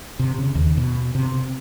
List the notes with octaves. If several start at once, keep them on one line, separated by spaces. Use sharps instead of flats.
C3
C#3
D#2
B2
C3